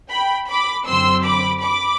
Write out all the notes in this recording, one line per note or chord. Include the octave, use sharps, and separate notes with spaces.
G5 B5
B5 D6
F#2 D3 F#3 C4 C6 E6
B5 D6
B5 D6